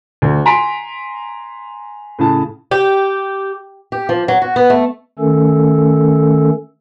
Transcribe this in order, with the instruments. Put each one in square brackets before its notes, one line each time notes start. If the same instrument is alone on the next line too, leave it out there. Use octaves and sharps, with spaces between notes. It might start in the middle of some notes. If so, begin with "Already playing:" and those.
[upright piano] D2
G#5 A#5 C6 B6 D7
A2 C#3 A5
[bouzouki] G4
[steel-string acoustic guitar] G4
F3
F#3
F#4
B3
A3
[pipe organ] D#3 A3 C#4 A4